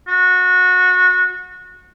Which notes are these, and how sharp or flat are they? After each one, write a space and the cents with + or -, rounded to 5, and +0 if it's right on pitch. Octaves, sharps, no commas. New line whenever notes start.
F#4 -25